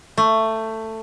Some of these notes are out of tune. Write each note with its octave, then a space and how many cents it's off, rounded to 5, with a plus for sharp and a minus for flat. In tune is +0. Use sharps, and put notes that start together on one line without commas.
A3 +15